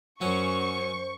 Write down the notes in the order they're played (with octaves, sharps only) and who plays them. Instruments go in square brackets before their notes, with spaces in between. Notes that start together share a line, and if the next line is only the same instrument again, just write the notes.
[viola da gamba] F#2 [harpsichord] F#3 C#4 [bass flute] C5 [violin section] C#6